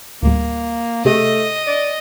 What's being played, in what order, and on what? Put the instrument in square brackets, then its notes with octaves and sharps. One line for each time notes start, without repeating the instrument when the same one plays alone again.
[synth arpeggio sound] D2 A2 G3 [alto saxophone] A#3
[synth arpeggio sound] C3 G4 G#4 [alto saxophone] A3 [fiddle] D#5
[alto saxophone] D5